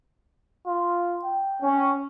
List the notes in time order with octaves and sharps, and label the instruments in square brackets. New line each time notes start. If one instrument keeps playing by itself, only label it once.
[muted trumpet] F4
G5
[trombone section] C#4